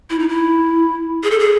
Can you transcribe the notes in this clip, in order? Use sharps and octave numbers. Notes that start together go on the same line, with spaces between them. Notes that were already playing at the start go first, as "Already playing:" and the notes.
E4
D#4
E4
G#4
A4
G#4